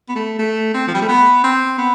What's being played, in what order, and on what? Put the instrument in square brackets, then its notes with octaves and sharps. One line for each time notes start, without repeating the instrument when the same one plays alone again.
[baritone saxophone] B3
A3
A3
C4
F3
G3
A3
B3
C4
B3